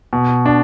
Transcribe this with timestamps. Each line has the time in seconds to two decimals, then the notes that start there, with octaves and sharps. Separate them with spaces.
0.13 B2
0.46 D4